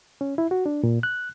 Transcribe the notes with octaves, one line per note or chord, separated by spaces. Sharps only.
C#4
E4
F#4
D4
A#2
F#6